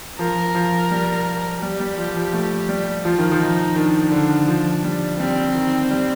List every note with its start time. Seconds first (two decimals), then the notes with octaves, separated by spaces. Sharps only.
0.19 F3 A#4
0.55 F3
0.91 G3
1.62 G3 G4
1.80 G3
1.98 F3
2.16 F3
2.33 A3
2.69 G3
3.05 F3 F4
3.19 D#3
3.32 F3
3.40 D#4
3.76 D#3 D4
4.11 D3
4.48 F3
4.84 G3
5.19 G3 C4
5.55 D#3
5.91 G3